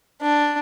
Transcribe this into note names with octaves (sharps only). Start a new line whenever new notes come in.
D4